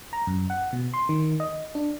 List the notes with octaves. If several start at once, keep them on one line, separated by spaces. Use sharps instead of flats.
A#5
F#2
F#5
B2
C6
D#3
D#5
D4